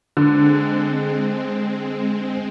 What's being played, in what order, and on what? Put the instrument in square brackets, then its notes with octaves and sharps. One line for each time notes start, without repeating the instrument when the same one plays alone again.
[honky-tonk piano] D3 [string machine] G#3 C4